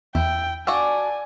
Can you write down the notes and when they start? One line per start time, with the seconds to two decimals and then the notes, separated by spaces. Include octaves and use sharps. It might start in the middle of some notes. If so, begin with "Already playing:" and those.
0.15 E2 E4 G5
0.67 D4 F#4 D5 F5 G#5 E6